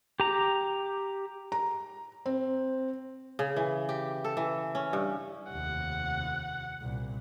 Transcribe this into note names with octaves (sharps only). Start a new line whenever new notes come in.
G4 A#5
A#5
C4
C#3
E3
G4
A4
E3
C#4
G2
F1 D#2 F#5
C2 A#2